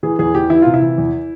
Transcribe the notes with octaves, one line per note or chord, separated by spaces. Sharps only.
E3 G#4
E2 G#4
E3 G4
E3 E4
C3 F4
E4
E3
E2